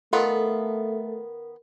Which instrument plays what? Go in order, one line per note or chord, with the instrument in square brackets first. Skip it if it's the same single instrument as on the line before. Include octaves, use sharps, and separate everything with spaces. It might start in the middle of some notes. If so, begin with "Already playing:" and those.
[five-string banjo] D#3 B3 F4 [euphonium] A3 [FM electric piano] A4 [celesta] A#4